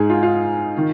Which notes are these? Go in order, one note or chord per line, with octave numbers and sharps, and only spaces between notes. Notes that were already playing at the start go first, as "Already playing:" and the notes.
Already playing: G#2 G#3 D#4 G#4
F4
F4
D#3